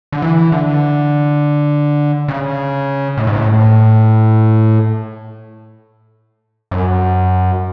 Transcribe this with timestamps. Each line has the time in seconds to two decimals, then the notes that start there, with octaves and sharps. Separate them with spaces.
0.12 D3
0.22 E3
0.52 D3
2.28 C#3
3.17 A2
3.27 G#2
3.36 A2
6.71 F#2